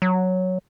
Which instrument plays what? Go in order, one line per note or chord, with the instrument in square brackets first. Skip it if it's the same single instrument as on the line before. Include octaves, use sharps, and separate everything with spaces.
[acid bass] F#3